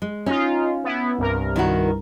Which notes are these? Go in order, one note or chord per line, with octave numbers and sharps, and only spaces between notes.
G#3
C#4 D#4 F4
B3 E4
C2 G2 A#4
D#3 E4 F#4